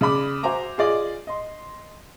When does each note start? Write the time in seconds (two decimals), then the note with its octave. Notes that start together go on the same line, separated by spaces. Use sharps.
0.01 C#3 D5 B5 D6
0.43 F#4 C5 E5 G#5 A#5 D6
0.78 F4 G#4 D5 D#5
1.27 D#5 C6